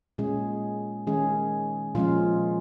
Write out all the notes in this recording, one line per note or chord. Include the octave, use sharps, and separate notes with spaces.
A#2 G#3 C#4 G#4
D#3 G#3 C#4 G#4
A#2 F3 G#3 C#4 F4